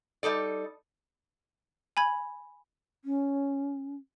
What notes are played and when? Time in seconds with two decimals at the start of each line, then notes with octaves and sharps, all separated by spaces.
0.23 G3 D#4 A4 D5
1.97 G#5 B5 G#6
3.05 C#4